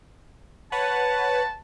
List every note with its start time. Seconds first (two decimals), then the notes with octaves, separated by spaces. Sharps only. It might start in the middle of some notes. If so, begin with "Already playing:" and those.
0.72 B4 C#5 F#5 A5